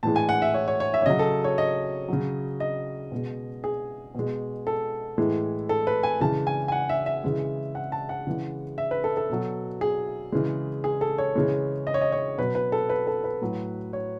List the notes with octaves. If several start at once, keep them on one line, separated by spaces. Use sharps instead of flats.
A2 E3 G#3 A5
G#5
F#5
E5
C#5
C#5
C#5
E5
C#5
C#3 F#3 D#5
A4
C#5
D#5
C#3 F#3
D#5
B2 G#3
G#4
B2 G#3
A4
A2 E3 G#3
A4
B4
G#5
C#3 E3 G#3 A5
G#5
G#5
F#5
E5
E5
C#3 E3 G#3
F#5
A5
F#5
C#3 E3 G#3
E5
B4
A4
A4
B2 F#3
G#4
C#3 E3 G#3
G#4
A4
C#5
C#3 E3 G#3
D#5
C#5
D#5
C#5
B2 F#3 B4
B4
A4
B4
A4
B4
A2 F#3
C#5